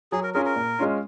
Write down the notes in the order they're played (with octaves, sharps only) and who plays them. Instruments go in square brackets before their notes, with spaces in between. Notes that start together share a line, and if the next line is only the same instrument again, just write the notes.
[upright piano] F#3 [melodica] G#4
[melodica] A#4
[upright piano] C#4 F4 G#4 [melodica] A#4
[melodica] A#4
[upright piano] A#2
G#3 C#4 F4